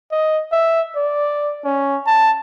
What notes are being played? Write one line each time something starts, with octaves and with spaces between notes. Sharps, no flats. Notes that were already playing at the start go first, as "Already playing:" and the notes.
D#5
E5
D5
C#4
A5